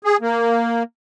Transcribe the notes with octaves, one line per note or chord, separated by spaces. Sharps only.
G#4
A#3